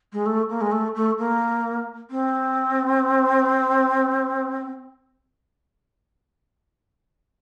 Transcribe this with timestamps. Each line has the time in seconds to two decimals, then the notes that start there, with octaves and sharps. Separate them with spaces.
0.13 G#3
0.26 A3
0.49 A#3
0.61 G#3
0.72 A3
0.95 A3
1.18 A#3
2.11 C4